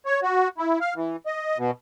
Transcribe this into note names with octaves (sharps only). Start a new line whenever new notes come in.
C#5
F#4
E4
F5
E3
D#5
B2